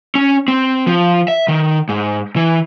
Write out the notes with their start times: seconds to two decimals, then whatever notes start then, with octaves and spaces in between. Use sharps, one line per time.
0.15 C#4
0.48 C4
0.87 F3
1.28 E5
1.48 D#3
1.89 G#2
2.36 E3